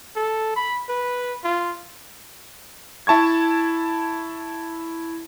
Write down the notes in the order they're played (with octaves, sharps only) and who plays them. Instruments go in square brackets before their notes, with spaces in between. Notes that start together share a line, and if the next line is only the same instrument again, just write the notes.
[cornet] A4
B5
B4
F4
[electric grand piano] E4 A5 C#6 G#6